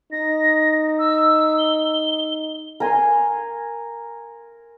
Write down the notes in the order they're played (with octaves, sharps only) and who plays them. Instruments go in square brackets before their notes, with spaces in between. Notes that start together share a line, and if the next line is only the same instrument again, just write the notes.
[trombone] D#4 [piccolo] A#6
[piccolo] E6
G7
[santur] A#4 G#5 C6